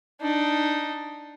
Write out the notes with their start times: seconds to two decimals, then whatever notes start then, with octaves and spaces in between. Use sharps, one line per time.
0.21 D4 D#4